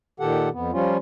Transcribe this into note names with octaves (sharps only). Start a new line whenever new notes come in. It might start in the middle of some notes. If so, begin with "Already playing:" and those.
A#2 D#3 G4 A4 F#5
F2 B3
F3 G3 C#4 F4